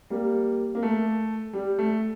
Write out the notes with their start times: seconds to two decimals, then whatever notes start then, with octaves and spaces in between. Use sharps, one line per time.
0.10 G3 A#3
0.75 A#3
0.83 A3
1.53 G3
1.78 A3